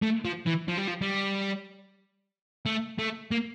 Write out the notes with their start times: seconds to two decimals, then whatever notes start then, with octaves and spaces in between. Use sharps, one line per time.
0.02 A3
0.25 F3
0.47 E3
0.68 F3
0.78 G3
0.88 F3
1.02 G3
2.66 A3
2.98 A3
3.31 A#3